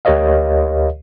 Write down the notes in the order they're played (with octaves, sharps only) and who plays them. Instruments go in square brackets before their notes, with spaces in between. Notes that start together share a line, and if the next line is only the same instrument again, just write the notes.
[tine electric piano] D2 G4 A#4 C#5 D#5 F5